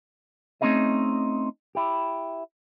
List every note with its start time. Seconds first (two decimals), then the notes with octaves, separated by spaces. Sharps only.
0.61 A3 C4 C#4 D#4 G#4 D#5
1.75 E4 G4